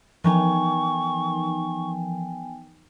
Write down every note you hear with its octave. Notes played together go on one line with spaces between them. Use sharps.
E3 F3 B3 D#4 G5 G#5 C#6